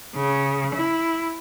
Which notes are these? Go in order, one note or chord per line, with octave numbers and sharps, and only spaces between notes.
C#3
E4